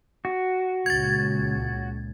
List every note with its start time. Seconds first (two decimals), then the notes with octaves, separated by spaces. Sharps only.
0.25 F#4
0.86 C#2 A#2 G#6 A6